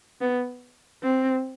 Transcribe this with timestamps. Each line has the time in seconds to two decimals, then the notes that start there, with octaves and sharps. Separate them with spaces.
0.21 B3
1.03 C4